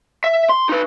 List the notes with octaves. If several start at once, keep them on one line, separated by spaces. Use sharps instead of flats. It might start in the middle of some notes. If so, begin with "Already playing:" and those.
E5
C6
D#4 B4